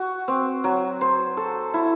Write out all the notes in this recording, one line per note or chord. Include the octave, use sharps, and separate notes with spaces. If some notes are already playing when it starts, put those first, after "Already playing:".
Already playing: F#4
C4
F#3
C5
A4
E4